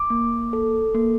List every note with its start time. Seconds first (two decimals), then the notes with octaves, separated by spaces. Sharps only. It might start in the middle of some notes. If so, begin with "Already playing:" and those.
Already playing: D6
0.10 A#3
0.53 A4
0.95 A#3